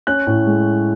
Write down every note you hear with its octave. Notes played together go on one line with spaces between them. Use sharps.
C#4 F#6
A2
G#3